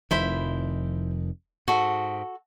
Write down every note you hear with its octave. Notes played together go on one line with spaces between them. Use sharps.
F1 F2 D#3 E4 C5 B5
G#2 F#4 A4